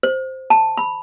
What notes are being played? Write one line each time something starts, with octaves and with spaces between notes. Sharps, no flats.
C5
A5
B5